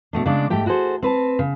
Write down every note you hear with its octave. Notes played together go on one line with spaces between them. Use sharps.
B2 A3 D4
C#3 G#3 D4 D5
G#2 A3 G4 G5
E4 F#4 G#4 A4 C5
C4 B4 A5
C#3